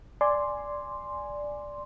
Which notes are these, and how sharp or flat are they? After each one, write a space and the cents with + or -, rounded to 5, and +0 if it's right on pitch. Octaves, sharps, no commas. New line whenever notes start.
D5 +0 G#5 +0 C6 +0